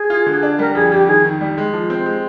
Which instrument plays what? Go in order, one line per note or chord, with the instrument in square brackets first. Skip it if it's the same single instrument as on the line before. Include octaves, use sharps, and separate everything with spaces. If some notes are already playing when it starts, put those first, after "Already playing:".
Already playing: [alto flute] G#4
[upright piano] F4
D3
D4
[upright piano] G3 [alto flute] A#4
[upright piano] F2 [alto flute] G#4
[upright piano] F2 [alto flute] G4
[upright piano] D#3 [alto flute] G#4
[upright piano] D#3
G3
G#3
F3
C4
G#3